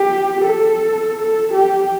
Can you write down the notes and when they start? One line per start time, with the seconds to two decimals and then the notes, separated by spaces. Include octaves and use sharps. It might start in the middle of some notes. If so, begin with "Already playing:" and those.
Already playing: G4
0.45 A4
1.18 A4
1.54 G4